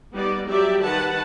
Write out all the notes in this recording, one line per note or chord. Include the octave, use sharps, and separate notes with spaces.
G3 B3 D#4 D5
F#3 G3 G4 D5 E5
D#3 B4 F#5 A5